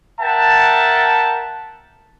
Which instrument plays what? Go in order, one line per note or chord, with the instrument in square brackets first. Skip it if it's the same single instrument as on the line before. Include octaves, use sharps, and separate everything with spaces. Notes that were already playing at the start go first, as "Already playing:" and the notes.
[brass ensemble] A#4 E5 F#5 G5 A5